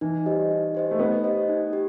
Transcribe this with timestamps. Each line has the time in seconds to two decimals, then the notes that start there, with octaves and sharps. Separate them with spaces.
0.01 E3 D#4
0.26 G3 G4 C5 D#5
0.51 D#4
0.75 G4 C5 D#5
0.91 A3
0.99 B3 D#4
1.24 G4 C5 D#5
1.49 D#4
1.73 G4